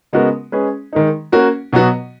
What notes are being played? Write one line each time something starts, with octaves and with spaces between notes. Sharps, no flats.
C#3 G#3 B3 F#4 A#4
G#3 C#4 G#4 B4
D#3 G#3 D#4
A#3 C#4 F#4 A#4
B2 F#3 B3 F#4